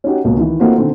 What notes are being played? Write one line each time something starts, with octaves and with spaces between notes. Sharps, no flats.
C#4 D#4 F#4 G4
C#2 B2 A#3
D#3 E3
A3 A#3 C4 D#4 F4 F#4
B2 D3 D#3 C4